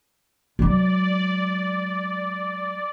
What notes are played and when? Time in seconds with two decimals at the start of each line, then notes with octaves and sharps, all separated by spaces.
0.59 F#3 G#3 D5